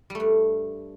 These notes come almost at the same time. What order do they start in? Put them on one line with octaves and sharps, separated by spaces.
G3 A3 G2